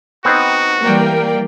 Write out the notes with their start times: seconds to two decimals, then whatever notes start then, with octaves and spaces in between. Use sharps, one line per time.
0.25 B3 C4 D#4 F#4
0.81 E3 G3 A#3 A#4 D5 G5